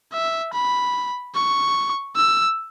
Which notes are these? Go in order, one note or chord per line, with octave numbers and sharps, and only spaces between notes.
E5
B5
C#6
E6